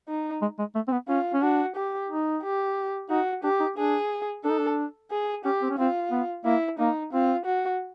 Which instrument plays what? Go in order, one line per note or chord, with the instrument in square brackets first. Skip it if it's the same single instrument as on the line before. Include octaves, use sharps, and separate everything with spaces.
[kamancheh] D#4
[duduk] G#3
G#3
A3
C4
B3
[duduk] C#4 [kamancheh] F4
[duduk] C#4
[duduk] D4 [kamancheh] F#4
[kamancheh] G4
[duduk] D#4
[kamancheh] G4
[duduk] D#4 [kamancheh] F#4
[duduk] D4 [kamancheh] G4
[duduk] D#4
[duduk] D4 [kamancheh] G#4
[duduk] D4 [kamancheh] A4
[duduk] D#4
D4
[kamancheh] G#4
[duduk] C#4 [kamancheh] G4
[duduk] C4
C#4
[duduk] C4 [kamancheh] F4
[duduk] B3
[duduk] A#3 [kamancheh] E4
[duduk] A#3 [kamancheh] D#4
[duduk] C4 [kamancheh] F4
[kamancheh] F#4